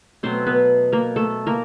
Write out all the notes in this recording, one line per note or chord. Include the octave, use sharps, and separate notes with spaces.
B2 F#3 A3 C4 C5
B3 B4
A#3 A#4
A3 A4
A#3 A#4